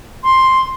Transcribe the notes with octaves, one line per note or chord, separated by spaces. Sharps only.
C6